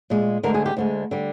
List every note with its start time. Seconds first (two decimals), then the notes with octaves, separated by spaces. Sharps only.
0.10 A#2 G#3
0.43 D2 D3 G#3 A#4
0.54 G#4
0.66 G4
0.77 D2 D3 G#3
1.11 D3 G3